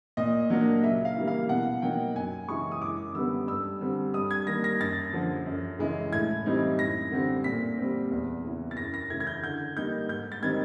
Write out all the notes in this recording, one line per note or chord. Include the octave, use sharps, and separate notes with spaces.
A#2 D#5
F#3 A#3 D4
C#3 E5
F5
E3 G3 A#3
F5
B2 F#5
F#3 A#3 D#4 G5
F#2 G#5
C#3 E3 G#3 C#6
D#6
F#2 D6
D3 G3 B3 E6
G2 E6
D3 G3 C4
G2 D#6
G#6
D#3 G3 A#3 A#6
A#6
F#2 A6
D3 F3
F#2
C#3 E3 G#3
A2 G#6
E3 G3 C4 D#4
F#2 A#6
D3 G3 C4
A#2 B6
G3 C4
E2
C#3 E3
A6
F#2 A#6
A#6
C#3 E3 A3 G#6
G#6
G6
D3 G6
G3 A#3 D#4 G6
G#2 G6
A6
D#3 G3 C4 D#4 G#6